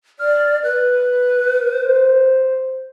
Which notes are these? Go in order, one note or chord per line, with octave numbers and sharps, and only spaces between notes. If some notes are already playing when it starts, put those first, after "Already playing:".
D5 F6
B4 F#6
C5